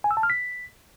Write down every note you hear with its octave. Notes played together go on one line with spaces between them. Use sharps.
G#5
E6
A5
F6
B6